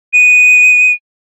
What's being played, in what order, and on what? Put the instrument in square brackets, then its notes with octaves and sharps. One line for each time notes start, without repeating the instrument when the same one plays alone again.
[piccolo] D#7